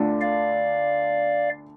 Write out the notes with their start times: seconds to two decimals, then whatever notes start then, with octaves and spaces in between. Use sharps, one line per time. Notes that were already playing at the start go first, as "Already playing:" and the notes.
Already playing: D2 D3 A3 D4 F4
0.21 D5 F5